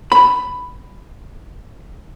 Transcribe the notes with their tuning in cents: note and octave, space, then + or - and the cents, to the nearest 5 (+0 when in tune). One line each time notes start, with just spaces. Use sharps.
B5 +5